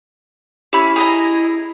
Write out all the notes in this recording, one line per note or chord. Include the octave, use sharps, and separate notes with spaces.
C#4 E4 G4 E5 B5
G#4 D#5 A#5